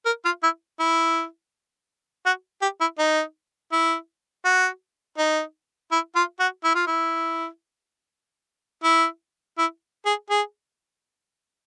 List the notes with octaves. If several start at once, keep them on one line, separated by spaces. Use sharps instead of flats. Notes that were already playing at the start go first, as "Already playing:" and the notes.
A#4
F4
E4
E4
F#4
G4
E4
D#4
E4
F#4
D#4
E4
F4
F#4
E4
F4
E4
E4
E4
G#4
G#4